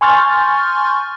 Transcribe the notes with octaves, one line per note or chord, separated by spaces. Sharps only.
G#5 C6 C#6 F6 G6 A6